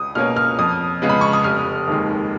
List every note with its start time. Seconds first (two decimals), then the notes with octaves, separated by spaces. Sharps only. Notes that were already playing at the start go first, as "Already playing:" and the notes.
Already playing: C#2 D#6
0.15 B2 A#3 C#4 F6
0.37 F6
0.59 F2 D#6
1.02 C#3 G#3 B3
1.09 B5
1.21 C#6
1.33 D#6
1.44 F1 F6
1.88 D#2 D#3 G#3